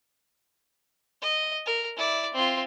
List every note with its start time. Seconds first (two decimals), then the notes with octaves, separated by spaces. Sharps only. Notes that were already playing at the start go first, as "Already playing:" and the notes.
1.21 D#5
1.66 A#4
1.96 E4 D5
2.34 C4 F4